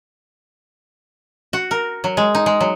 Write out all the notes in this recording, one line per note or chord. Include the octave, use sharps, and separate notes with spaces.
F#4
A#4
F#3
G#3
D#4
G#3
F#3